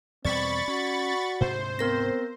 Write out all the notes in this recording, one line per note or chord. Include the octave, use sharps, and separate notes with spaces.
E2 B2 G3 C4 D5 B5 C#6 A6
C#4 F#4
D2 G#2 C3 C5
B3 C4 A#4 A#6